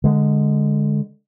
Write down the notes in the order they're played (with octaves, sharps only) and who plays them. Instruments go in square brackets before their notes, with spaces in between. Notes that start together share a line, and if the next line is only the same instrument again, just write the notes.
[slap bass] D3 G#3